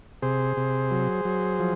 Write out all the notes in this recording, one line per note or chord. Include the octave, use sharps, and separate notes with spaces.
C3 G#4 C5
C3
F#3
F#3
F3